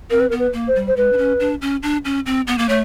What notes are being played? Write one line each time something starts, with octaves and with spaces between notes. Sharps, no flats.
C4 A#4
B4
B3 A#4
B4
A#3
C5
G3
C5
G#3 B4
D4
C#4
D4
C#4
D4
C#4
C4
B3
A#3
A3 C#5